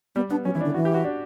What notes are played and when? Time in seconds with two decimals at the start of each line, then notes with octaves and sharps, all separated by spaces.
0.15 G3 B3
0.31 B3 D4
0.45 F#3 C#4
0.55 E3 E4
0.61 D4
0.65 D3
0.74 E3 F#4
0.85 G4
0.94 F#4
1.04 D4